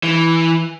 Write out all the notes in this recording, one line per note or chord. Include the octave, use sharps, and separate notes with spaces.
E3